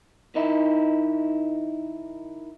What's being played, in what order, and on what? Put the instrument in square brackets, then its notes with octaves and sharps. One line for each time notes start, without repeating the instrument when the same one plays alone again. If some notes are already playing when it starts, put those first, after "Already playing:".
[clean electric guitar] D#3 D#4 E4